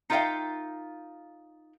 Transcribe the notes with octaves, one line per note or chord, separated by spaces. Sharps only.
D#4 F4 A#4 E5 F5 G5